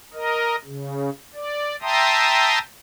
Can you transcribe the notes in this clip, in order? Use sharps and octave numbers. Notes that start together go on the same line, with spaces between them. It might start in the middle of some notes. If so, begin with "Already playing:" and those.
A#4 D#5
C#3
D5
E5 G5 A5 A#5 C6 D#6